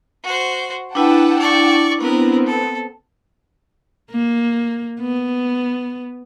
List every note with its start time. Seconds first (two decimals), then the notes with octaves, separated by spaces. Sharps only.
0.24 F#4 C5
0.95 D4 E4 B4 F#5 G5 A5
1.39 D5 C#6
2.01 B3 C4 A#4 B4
2.46 A4
4.11 A#3
5.01 B3